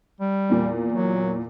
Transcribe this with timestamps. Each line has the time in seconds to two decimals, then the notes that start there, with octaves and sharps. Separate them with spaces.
0.21 G3
0.49 E2 A#2
0.92 F#3